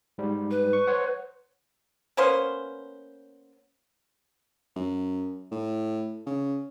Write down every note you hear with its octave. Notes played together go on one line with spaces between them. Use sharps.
G#2 G3
B4
C#6
C5 C#5 F#5
A#3 B3 C#4 C5
F#2
A2
C#3